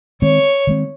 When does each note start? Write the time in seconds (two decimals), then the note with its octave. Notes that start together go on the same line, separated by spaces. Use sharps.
0.22 D#3 G#3 C4 C#5
0.67 D#3 G#3 C4